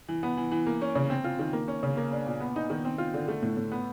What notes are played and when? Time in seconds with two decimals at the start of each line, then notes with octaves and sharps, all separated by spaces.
0.08 E3
0.23 B3
0.37 E3
0.51 E3
0.67 A#3
0.81 C#4
0.95 C#3
1.10 C4
1.24 F4
1.39 D#3
1.53 A#3
1.68 C#4
1.83 C#3
1.97 A#3
2.12 D4
2.27 A#2
2.40 B3
2.56 D#4
2.70 D#3
2.85 C4
2.98 F4
3.14 D3
3.28 A3
3.42 A2
3.57 A2
3.72 B3